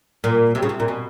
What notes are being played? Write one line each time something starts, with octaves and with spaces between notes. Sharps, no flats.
A#2
C3
C#3
C3
A#2
B2